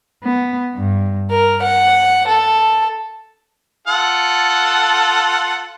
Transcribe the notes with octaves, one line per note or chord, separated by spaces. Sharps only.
B3
G2
A#4
F#5
A4
F4 A4 F#5